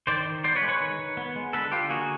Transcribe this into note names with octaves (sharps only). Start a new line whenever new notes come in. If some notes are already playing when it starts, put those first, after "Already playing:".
D#3 C5 D5
D#3
B3 C5 D5
B4 C#5
G#3
B4 C#5
D#3
D#3
B3
G#3
D3 A4 B4
D3 F4 G4
A#3 F#4 G#4